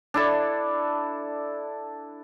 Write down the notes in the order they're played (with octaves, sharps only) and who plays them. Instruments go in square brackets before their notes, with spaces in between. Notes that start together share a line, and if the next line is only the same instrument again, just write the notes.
[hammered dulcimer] D4 E4 A4